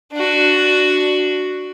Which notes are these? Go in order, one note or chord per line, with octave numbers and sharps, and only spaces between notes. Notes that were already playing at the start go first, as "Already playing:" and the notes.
D4 F#4